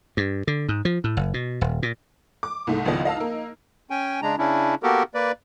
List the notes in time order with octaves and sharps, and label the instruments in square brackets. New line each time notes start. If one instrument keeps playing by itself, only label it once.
[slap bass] G2
D3
G#2
F3
A2
F#1
B2
D#1
A#2
[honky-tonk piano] D6
C2 G#2 A3
G#1 C#2 F3 B3 F4 D#5
D#5 F5 A5 E6
A#3 D#4
[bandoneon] C#4 G5 G#5
C#3 G#3 D4 A#5
C#3 C#4 D4 E4
A#3 B3 F#4 G4 A4 A#4
A#3 B4 D5